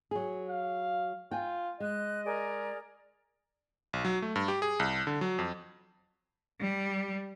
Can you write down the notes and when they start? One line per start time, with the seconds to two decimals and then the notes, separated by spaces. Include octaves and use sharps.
0.11 F#3 G#4
0.49 F5
1.31 F4 G5 G#5
1.80 G#3 D#5 F#6
2.25 G#4 A#4 D5
3.93 B1
4.05 F#3
4.22 A3
4.36 G2
4.48 G4
4.62 G#4
4.80 C2
5.07 D3
5.21 F#3
5.39 F2
6.60 G3